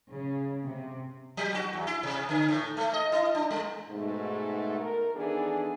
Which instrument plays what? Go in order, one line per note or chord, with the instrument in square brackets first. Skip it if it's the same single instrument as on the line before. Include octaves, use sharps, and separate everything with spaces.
[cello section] C#3
C3
[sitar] F#3
F#4
E2
E4
C3
D3
A2
A3
D#5
E4
D4
G#3
[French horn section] G#2 B2 A3
A#4
D#3 E3 B3 D4 G#4 A4